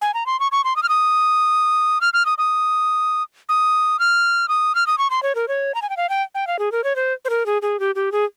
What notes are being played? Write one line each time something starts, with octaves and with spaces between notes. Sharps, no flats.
G#5
A#5
C6
C#6
C#6
C6
D#6
F6
D#6
F6
F6
D#6
D#6
D#6
F6
D#6
F6
D#6
C#6
C6
C#5
A#4
C#5
A#5
G#5
G5
F5
G5
G5
F5
G#4
A#4
C#5
C5
C5
A#4
G#4
G#4
G4
G4
G#4